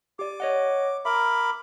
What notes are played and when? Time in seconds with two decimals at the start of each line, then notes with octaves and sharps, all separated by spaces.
0.19 G4 D5 D6
0.40 C#5 D#5 F#5
1.05 A#4 E5 B5 D6